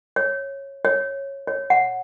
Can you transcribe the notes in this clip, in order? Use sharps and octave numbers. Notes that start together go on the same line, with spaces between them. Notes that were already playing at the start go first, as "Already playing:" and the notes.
C#5
C#5
C#5
F#5